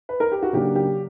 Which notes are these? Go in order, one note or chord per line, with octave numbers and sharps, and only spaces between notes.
B4
A#4
G4
F#4
C#3 F#3 A#3 D4 G4
G4